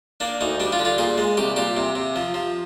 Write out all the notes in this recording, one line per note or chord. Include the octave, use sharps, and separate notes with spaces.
A#3 D4
D2 D#4
G3 D4
F4
D3
F4
A#2 G#4
G#3
C2 G4
A#2 G4
C3
C3
F3
F3